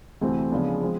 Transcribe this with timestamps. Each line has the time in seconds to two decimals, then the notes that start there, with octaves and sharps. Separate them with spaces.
0.21 D2 C3 E3 A3 C4
0.52 C#3 F3 G#3 B3 D4
0.81 F3 G#3 C4